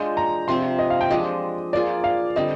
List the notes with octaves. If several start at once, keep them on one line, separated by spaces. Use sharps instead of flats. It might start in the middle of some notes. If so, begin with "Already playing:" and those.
Already playing: G#3 D4 F4 G6
A#5
C3 F3 C4 C6
D#5
F5
G5
F3 G#3 D4 G4 D#5
A#3 F4 G#4 D5
F5
D3 G3 C4 D#5